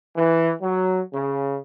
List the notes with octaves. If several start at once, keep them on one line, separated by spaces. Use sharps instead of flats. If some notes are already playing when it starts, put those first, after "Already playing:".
E3
F#3
C#3